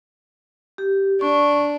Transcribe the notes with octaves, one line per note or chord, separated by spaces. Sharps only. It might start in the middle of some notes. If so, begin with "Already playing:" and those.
G4
D4 C#6